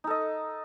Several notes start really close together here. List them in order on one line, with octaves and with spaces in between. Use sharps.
D#4 A4 D#5